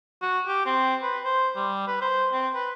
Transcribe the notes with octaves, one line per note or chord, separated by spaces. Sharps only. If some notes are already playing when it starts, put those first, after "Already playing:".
F#4
G4
C4
B4
C5
G3
B4
C5
C4
B4